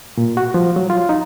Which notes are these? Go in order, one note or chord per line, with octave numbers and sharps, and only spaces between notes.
A#2
F#4
F3
F#3
F4
D#4